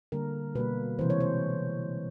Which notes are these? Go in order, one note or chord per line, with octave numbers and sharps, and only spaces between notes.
D3 G3 A#3 A#4
B2 G3 A#3 B4
C3 E3 G#3 C5
C#5
C5